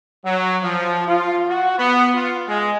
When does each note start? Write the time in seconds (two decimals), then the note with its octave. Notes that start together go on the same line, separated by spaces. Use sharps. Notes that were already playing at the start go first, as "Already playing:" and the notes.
0.25 F#3
0.63 F3
1.07 F4
1.48 F#4
1.79 B3
2.15 F4
2.48 G#3